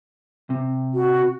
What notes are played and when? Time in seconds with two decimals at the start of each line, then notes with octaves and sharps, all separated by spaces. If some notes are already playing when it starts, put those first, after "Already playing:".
0.50 C3
0.94 F#4